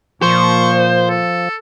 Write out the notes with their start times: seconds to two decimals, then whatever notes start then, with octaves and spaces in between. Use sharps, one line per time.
0.22 A#2 F3 C5 C#6
1.08 A4